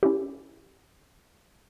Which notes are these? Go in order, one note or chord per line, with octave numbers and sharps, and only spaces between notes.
C#4 E4 G4